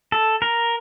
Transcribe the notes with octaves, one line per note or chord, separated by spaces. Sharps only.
A4
A#4